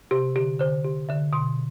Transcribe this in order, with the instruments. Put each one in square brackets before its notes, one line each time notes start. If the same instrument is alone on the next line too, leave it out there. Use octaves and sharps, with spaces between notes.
[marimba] C3 [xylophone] G4
[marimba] D3 [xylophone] G4
[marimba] D3 [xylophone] C5
[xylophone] G4
[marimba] D3 [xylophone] E5
[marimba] B2 [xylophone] C6